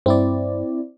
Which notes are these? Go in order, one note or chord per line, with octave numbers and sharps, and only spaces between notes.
G2 C4 E4 D5